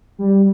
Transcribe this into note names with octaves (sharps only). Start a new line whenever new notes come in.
G3